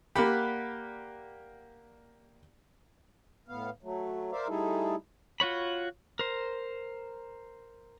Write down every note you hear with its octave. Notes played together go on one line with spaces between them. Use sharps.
A#3 G4 D5 F#5 B5
A2 B3 F5
F#3 A3
A#4 C5 D5 E5 F5
G3 A3 D#4 E4 G#4 A4
F4 F#4 C#5 B5
A#4 C5